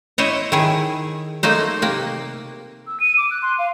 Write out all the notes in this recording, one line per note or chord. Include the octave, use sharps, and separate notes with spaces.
E4 C5 C#5 D#5
D#3 E4 G#4
A3 A#3 D#4 C5
C3 A#3
E6
D#7
D6
F#6
C6
F5